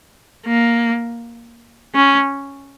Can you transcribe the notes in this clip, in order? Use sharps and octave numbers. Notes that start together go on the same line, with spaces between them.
A#3
C#4